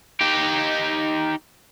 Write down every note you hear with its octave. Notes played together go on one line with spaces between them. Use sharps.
D#4 G4